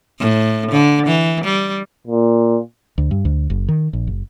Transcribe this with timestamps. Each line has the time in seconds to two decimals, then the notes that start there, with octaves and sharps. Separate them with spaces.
0.19 A2
0.71 D3
1.07 E3
1.45 G3
2.07 A#2
2.98 D2
3.11 G2
3.25 D2
3.50 F#1
3.69 D#3
3.93 A#1
4.07 F#1